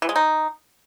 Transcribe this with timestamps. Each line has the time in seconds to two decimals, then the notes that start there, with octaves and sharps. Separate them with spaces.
0.02 E3
0.09 G#3
0.16 D#4